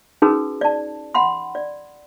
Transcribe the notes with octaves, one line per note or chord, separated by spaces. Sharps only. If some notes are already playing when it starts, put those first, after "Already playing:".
C#4 D#4 F#4 G#4 A#4 B4
D5 A5
F#5 B5 C6
D5